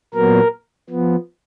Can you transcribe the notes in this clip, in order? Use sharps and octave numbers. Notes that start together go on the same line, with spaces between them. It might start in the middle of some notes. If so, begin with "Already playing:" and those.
A#2 F#3 B3 A#4
F3 B3